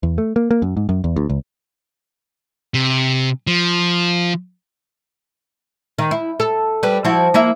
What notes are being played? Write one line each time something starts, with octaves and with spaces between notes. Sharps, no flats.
E2
A3
A#3
A#3
F#2
G#2
F#2
E2
D2
C#2
C3
F3
D#3
E4
A4
G3 B4
F3 E4 F#4
A#3 E4 E5